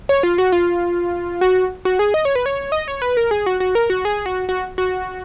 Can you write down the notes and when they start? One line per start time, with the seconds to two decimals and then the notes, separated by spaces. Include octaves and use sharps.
0.09 C#5
0.23 F4
0.38 F#4
0.52 F4
1.41 F#4
1.85 F#4
1.99 G#4
2.14 D#5
2.25 C#5
2.35 B4
2.46 C#5
2.72 D#5
2.88 C#5
3.02 B4
3.17 A#4
3.31 G#4
3.46 F#4
3.60 F#4
3.75 A#4
3.90 F#4
4.05 G#4
4.26 F#4
4.49 F#4
4.78 F#4